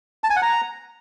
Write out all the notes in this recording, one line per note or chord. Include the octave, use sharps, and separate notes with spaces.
A5
G#5
F#5
A#5